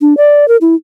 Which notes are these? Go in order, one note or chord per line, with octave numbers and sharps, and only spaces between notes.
D4
D5
A#4
E4